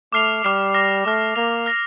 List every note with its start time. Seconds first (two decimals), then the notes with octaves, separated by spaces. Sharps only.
0.12 A3 D6 F6 C7 F7
0.44 G3 D6 F6 C7 F7
0.74 D6 F6 A#6
1.05 A3 D6 F6 A#6
1.36 A#3 F6 A#6 F7
1.66 F6 A#6 F7